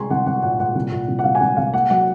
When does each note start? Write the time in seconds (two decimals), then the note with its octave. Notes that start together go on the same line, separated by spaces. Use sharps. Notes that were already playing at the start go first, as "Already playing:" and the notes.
Already playing: C2 G#3 G#5 A#5 C6 C#6
0.10 C2 F#5
0.26 C2 F#5
0.43 A#2 F#5
0.60 A#2 F#5
0.75 C2
0.92 A#2
1.08 C2
1.19 F#5
1.24 C2 F5
1.35 G#5
1.40 C2 F#5
1.57 C2 F5
1.74 A#3 F#5
1.90 F#3 F#5